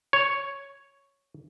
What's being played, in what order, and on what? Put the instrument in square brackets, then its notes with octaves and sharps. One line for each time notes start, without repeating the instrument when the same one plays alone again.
[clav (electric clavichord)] C#5